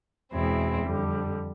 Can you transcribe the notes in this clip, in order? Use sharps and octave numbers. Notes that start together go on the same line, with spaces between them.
E2 B2 G#3 C4 E4
F2 D3 G3